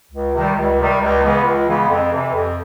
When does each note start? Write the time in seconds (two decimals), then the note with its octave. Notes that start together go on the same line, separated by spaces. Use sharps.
0.11 C#2
0.34 C3 D#3 G3
0.56 C#2
0.78 C3 D#3 G3
1.01 C#2
1.22 C#3 E3 G#3 B3
1.44 C#2
1.67 C#3 E3 G#3 B3
1.88 F2
2.11 C3 E3
2.33 F2